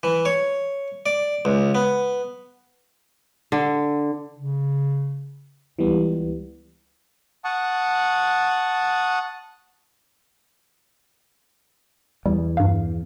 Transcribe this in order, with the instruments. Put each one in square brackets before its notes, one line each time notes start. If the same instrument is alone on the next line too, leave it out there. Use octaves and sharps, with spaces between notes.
[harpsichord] E3
C#5
D5
C#2
B3
[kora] D3
[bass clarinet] C#3
[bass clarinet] C#2 [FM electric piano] E3 G3 B3
[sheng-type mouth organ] F#5 A5 C#6 D#6
[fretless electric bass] E2 [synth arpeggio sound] G3
[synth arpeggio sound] G2 F5